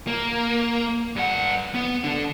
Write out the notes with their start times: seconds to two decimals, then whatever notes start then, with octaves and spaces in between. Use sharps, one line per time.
0.07 A#3
1.16 G2 F#5
1.75 B3
2.04 D3 D4